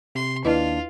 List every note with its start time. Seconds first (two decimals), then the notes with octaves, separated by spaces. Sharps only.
0.15 C3 C6
0.45 D#2 D4 E4 F4 B4 D#5 F5